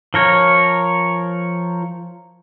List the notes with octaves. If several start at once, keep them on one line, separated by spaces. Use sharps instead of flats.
F3 A#4 C#5